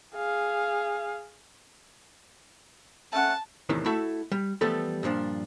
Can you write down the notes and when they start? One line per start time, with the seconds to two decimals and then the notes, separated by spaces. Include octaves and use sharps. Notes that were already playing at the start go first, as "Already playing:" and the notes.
0.15 G#4 F5
3.13 A3 C#4 F#5 A5
3.69 E2 A2 C3 D#3 E3
3.86 A3 E4 F#4 A4 E5
4.32 G3
4.61 E3 F3 G3 A3 B3 A4
5.03 G2 A#2 F3 D4